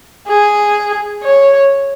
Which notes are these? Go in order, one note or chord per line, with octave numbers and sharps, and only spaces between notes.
G#4
C#5